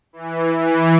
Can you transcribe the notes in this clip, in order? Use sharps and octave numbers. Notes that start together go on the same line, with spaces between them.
E3
E3